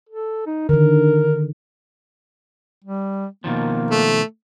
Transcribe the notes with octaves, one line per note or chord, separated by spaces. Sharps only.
A4
D#4
D3 D#3 A#4
G3
B2 D#3 F3 A#3
A3